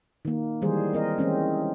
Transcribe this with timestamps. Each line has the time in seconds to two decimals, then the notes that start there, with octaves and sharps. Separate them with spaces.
0.25 D#3 A#3
0.62 D#3 E3 G3 G#3 G#4 C5
0.93 C4 A#4 D#5
1.18 E3 G#3 C4 C#4